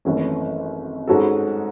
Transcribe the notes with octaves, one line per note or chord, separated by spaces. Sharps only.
G#1 F#2 E3 A3 C#4
G#2 G#3 C#4 F#4 A4